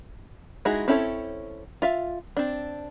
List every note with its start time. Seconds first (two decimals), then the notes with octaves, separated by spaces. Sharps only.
0.65 G#3 D#4 E4 F#4 G#4
0.88 C4 C#4 E4 A4 C#5
1.82 F4 E5 F5
2.37 C4 D4